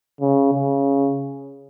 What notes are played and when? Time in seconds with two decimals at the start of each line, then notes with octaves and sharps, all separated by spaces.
0.21 C#3
0.54 C#3